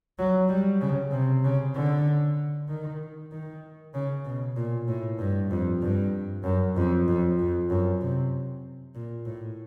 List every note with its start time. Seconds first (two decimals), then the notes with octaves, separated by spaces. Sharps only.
0.18 F#3
0.49 G3
0.81 C#3
1.11 C3
1.44 C#3
1.75 D3
2.68 D#3
3.32 D#3
3.94 C#3
4.25 B2
4.56 A#2
4.88 A2
5.19 G2
5.50 F2
5.82 G2
6.44 F#2
6.76 F2
7.07 F2
7.39 F2
7.70 F#2
8.01 C3
8.95 A#2
9.25 A2